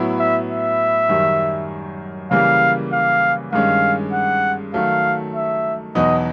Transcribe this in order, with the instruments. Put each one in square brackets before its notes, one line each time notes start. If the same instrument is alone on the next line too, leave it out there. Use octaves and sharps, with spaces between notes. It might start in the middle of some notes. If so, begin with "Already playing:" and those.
Already playing: [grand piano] A2 F#3 B3 E4
[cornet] E5
E5
[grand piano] F#2 D#3 G3
[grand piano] C#3 E3 G3 A#3 [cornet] F5
[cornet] F5
[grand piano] G2 D#3 G#3 C#4 [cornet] F5
[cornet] F#5
[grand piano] D#3 F#3 A3 [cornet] F5
[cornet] E5
[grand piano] E2 B2 F#3 B3 D#4 [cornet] D#5